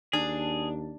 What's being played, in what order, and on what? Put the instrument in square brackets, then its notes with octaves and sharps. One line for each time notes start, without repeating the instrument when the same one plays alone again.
[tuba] D#2 [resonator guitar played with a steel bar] D4 [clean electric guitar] G#4